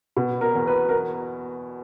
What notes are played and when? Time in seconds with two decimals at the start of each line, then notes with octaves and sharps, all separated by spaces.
0.17 B2
0.41 A#4
0.55 E2
0.67 B4
0.89 A#4